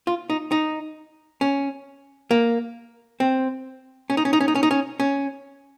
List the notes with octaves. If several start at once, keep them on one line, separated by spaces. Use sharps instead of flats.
F4
D#4
D#4
C#4
A#3
C4
C#4
D#4
C#4
D#4
C#4
D#4
C#4
D#4
C#4
C#4